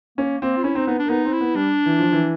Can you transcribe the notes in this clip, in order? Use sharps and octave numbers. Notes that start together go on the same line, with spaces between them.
A#3 C#4
A#3 C4
F4
C#4 E4
C4 D#4
B3 D#4
D4
A#3
B3 D#4
C4
E4
B3
G3 D4
E3
F3
E3